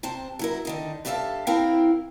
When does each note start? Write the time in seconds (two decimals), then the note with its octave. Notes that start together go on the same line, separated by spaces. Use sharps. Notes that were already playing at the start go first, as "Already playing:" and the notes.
0.03 C3 C4 C5 A5
0.39 F#3 E4 A#4
0.65 D3 D#3 D#4
1.05 G2 G4 A4 E5 F5 A5
1.47 C4 E4 A#4 F5 G5